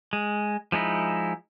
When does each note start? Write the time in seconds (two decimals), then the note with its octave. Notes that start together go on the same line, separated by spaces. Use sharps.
0.13 G#3
0.72 F3 G#3 D#4 E4